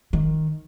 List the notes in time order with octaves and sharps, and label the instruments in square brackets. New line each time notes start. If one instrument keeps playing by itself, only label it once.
[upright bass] D#3